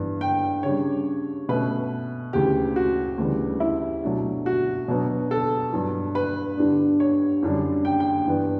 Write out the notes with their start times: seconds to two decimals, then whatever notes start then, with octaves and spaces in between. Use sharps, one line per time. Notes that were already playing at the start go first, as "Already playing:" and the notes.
Already playing: G2 E3 B3
0.21 G5
0.63 C#3 G3 D4 C#5
1.49 B2 A3 C#4 B4
2.33 D2 C#3 E3 G4
2.76 F#4
3.18 D2 C#3 E3 G3 B3
3.60 E4
4.03 B2 F#3 A3 D4
4.46 F#4
4.88 B2 F#3 B3 D4
5.31 A4
5.73 G2 F#3 B3
6.15 B4
6.57 G2 D3 G3 B3 D4
7.00 C#5
7.43 F#2 D3 G3 D4
7.85 G5
8.00 G5
8.27 G2 E3 B3 D4